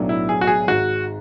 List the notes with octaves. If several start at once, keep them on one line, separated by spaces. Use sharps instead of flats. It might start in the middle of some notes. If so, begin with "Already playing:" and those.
Already playing: B1 A2 F#3 B3 D4
E4
G#4
F#4
G#4
G#1 G#2 G#3 F#4